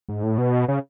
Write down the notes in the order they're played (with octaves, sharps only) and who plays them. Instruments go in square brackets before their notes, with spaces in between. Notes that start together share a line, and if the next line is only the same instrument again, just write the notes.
[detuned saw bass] G#2
A2
B2
C#3